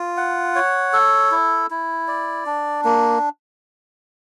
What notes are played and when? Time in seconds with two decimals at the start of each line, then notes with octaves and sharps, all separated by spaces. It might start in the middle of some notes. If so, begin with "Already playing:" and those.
Already playing: F4
0.17 F#5
0.55 C#5
0.93 A4
1.31 E4
1.70 E4
2.08 D5
2.46 D4
2.84 A#3